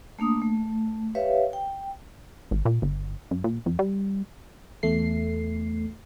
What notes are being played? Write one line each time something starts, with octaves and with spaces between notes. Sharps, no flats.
A3 A#3 D4 D#6
A3
G4 B4 C#5 E5 F5
G5
G#1
A#2
G1
F#2
A#2
F2
G3
E2 A3 C7